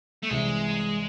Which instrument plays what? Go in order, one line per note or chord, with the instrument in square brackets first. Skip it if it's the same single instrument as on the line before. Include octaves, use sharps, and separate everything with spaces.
[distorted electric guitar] A3
[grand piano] C2 C3 E3 G3 [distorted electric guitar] G#3